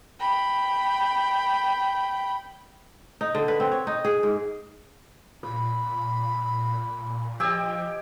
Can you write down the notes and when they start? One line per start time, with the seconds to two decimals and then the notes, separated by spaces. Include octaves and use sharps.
0.20 G5 B5
3.21 D#4
3.35 D3
3.48 B4
3.60 C4
3.72 C#5
3.87 D#4
4.05 G#4
4.23 G#2
5.43 A#2 B5
7.40 F3 G4 D#5 G5 G#5 E6